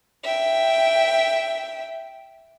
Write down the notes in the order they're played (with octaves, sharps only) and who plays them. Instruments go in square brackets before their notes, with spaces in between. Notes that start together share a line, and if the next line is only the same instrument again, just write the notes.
[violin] E5 G5